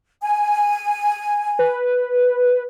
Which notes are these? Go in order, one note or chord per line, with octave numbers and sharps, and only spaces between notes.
G#5
B4